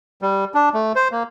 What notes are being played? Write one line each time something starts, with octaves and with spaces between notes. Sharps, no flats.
G3
D4
A3
C5
A#3